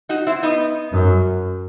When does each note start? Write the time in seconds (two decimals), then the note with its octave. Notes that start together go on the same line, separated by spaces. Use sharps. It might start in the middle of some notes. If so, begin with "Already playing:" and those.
0.09 D#4 F#4
0.27 C4 E4
0.43 B3 D#4
0.93 F#2